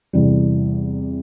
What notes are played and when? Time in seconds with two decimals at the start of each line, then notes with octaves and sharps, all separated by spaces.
0.13 E2 C3 E3 G3